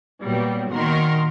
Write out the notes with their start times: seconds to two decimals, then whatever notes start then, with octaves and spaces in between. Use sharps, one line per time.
0.22 A#2 F#3 G3 B3
0.71 A#2 D#3 F#4 A#4 C6